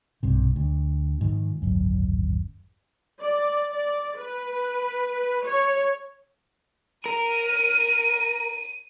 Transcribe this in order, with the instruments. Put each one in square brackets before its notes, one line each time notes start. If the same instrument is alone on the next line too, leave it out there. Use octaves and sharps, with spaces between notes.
[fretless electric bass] B1 G2 C3
D2
G#2 D#3 F3
D1 G#1 F#2
[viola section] D5
D5
B4
C#5
[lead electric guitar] A#4 [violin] D#7